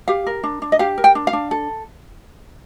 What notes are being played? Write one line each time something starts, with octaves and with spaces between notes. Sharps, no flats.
G4 F5
A#4
D4
D4
D#5
G4 F5
A#4
G5
D4
F5
D4
A4